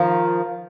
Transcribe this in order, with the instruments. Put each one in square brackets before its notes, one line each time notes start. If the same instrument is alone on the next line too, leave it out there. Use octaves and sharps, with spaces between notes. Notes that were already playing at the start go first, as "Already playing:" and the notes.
Already playing: [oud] D#3 F3